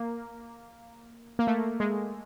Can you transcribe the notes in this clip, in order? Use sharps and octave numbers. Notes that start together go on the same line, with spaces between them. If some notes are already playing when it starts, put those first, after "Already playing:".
Already playing: A#3
A#3
A3
G#3